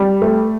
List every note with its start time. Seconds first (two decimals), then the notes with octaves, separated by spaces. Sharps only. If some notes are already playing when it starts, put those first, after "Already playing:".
Already playing: G3
0.22 A3